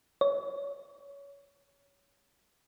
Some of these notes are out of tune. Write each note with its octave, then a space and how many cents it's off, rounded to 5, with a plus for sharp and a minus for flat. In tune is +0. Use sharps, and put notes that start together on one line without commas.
C#5 +20